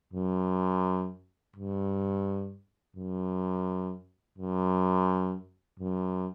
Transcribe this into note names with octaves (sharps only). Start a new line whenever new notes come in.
F#2
G2
F#2
F#2
F#2